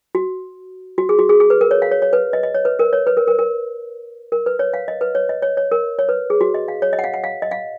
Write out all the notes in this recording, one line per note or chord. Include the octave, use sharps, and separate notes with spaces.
F#4
F#4
G#4
F#4
G#4
G#4
B4
A#4
C#5
F5
C#5
C#5
B4
D#5
D#5
C#5
B4
A#4
C#5
B4
A#4
A#4
A#4
A#4
B4
C#5
F5
D#5
B4
C#5
D#5
C#5
C#5
A#4
C#5
B4
G#4
F#4
D#5
F5
C#5
D#5
F#5
F5
F#5
F5
D#5
F5